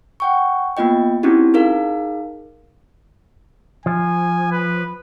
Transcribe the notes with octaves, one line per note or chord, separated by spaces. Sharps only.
F#5 G5 C#6
A#3 B3 F4 D#5 G5
C4 C#4 D#4 E4 F#4 G4
D#4 G#4 A#4 F5
F3 G#5
B4